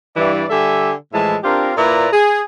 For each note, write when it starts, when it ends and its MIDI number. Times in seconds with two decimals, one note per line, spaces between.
0.17 0.45 43
0.17 0.45 52
0.17 0.45 74
0.50 0.93 50
0.50 0.93 55
0.50 0.93 67
0.50 0.93 69
0.50 0.93 76
0.50 0.93 80
1.13 1.37 45
1.13 1.37 52
1.13 1.37 53
1.13 1.37 56
1.13 1.37 76
1.13 1.37 81
1.44 1.72 60
1.44 1.72 62
1.44 1.72 65
1.44 1.72 67
1.44 1.72 70
1.77 2.08 46
1.77 2.08 58
1.77 2.08 64
1.77 2.08 71
1.77 2.08 74
1.77 2.08 82
2.13 2.41 68